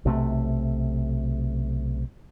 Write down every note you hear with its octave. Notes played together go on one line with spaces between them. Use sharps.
B1 C3 A3